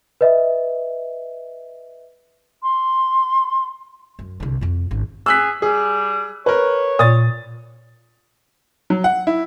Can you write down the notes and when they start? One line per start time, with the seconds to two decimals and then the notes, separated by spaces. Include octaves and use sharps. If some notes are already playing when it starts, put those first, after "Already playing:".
0.21 B4 D#5 E5
2.62 C6
4.19 F#2
4.40 C2 D3
4.61 F2 F4
4.91 G#1 C#4
5.26 G#4 E6 F#6 B6
5.62 G3 G#4
6.46 A#4 B4 C#5
6.99 A#2 D#6 A6
8.90 F#3
9.04 F#5
9.27 E4